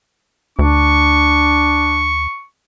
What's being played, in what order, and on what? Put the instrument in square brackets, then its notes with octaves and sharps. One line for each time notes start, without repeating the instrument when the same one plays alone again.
[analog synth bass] D2 [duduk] D4 [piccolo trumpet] C#6